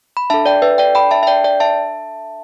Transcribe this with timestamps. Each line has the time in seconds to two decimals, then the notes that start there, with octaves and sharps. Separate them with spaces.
0.17 B5
0.30 D4 A4 E5 A5
0.46 D5 G5
0.62 B4 E5
0.78 D5 G5
0.95 G5 B5
1.11 E5 A5
1.23 E5
1.27 D5 G5
1.44 D5 G5
1.60 E5 A5